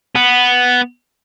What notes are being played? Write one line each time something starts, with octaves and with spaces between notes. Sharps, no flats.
B3